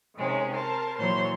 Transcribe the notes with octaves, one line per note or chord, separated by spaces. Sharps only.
C3 D#3 G#3 C#4
A#4 C5 A5
A#2 E3 F#3 C5 C#5 C6